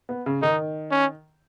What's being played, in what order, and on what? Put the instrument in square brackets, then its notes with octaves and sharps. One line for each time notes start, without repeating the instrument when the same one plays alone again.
[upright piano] B3
C#3
[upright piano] D#3 [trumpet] D#4
[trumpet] C#4